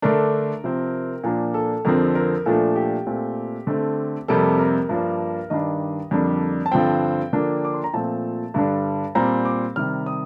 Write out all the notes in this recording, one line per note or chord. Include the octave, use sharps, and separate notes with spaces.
D3 A3 D4 A#4
C3 F3 C4
A#2 F3 A#3 D4 A#4
A4
F2 D3 F3 C4 A#4
A#4
A#2 F3 A3 D4 A4
G4
A#2 A3 C4
D3 A3 C4
F2 C3 G3 A#3 A4
A#4
G2 F3 A#3 D4
G2 D#3 G3 D4 D#5
F2 D3 G3 A#3 D4
A5
G2 D3 F3 C4 G5
D3 F3 A#3 D4
D6
C6
A#5
A#2 F3 A3 C4 A5
G2 D3 G3 D4
A#2 G3 C4 A#5
D6
C3 D#3 G3 F6
D#6